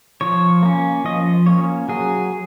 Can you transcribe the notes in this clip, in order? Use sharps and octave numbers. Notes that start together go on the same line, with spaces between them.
F3 C#5
A#3 C#4
F3 D#5
A#3 C#4 C#5
F#3 G#4